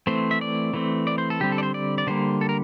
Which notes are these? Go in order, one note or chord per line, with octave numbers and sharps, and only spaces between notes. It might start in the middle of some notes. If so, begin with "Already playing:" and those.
E3 A3 C4 C5
E5
D5
E3 A3 C4
D5
C5
A4
D3 G3 C4 G4
A4
D5
C5
D5
D5
D3 G3 A#3 C5
A4
A#4